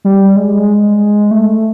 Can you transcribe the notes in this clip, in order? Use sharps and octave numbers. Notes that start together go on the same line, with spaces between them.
G3
G#3
A3